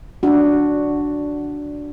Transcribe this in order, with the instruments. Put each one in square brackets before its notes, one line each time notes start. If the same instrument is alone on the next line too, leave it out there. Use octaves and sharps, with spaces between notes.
[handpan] D4 F#4